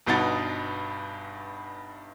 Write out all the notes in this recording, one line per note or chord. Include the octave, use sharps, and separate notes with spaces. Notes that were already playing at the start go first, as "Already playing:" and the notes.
G1 G2 B2 D#4 F#5 A6